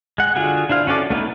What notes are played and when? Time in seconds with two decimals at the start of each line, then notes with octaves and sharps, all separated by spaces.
0.18 G#3 F#5
0.36 D3 F4 F#4 G#4
0.69 D4 E4 C5 F5
0.87 C#4 F#4 A4 D5
1.10 A3 B3 D#4 E4